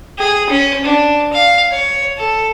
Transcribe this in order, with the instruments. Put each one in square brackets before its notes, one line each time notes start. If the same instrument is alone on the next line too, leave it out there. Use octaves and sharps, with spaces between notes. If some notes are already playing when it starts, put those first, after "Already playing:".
[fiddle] G#4
C#4
D4
F5
C#5
A4